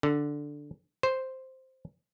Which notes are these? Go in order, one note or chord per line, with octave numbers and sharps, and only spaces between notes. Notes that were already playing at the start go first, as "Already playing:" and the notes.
D3
C5